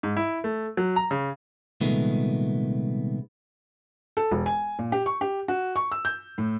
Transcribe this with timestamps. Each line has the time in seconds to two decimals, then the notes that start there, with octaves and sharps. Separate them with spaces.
0.03 G#2
0.17 E4
0.44 A3
0.77 F#3
0.96 A#5
1.11 C#3
1.81 C2 A#2 D#3 G#3 A3 B3
4.17 A4
4.31 E1
4.46 G#5
4.79 A#2
4.92 G4
5.06 C#6
5.21 G4
5.48 F#4
5.76 C#6
5.92 E6
6.05 G6
6.38 A2